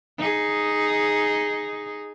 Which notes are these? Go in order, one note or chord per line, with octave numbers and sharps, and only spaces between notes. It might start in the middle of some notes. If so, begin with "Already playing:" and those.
D#4 G#4